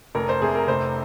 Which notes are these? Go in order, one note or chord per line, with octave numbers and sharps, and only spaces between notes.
F1 A#4
C5
C3 G#4
A#4
F1 C5